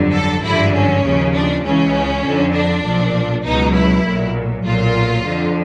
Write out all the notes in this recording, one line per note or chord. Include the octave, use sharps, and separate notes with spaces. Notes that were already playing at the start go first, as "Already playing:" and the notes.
Already playing: G1 F2 D3 F#3
A4
G#1 G2 D3 F3 E4
C#4
D#2 C#3 F3
D4
C#2 C#3 E3 C#4
F2 D3 F3
D4
B1 A#2 F3
C#2 B2 F#3 D#4
E4
B1 A#2 F#3
B1 A#2 F#3 F4
F2 D3 F3